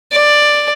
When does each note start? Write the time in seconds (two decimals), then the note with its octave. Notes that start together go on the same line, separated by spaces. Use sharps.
0.12 D5